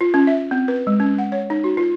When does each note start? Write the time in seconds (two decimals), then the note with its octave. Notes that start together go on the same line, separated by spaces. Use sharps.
0.01 F4
0.14 C#4
0.27 E5
0.51 C4
0.68 B4
0.87 G#3
1.00 C#4
1.18 F#5
1.32 C#5
1.50 D#4
1.64 F#4
1.77 F4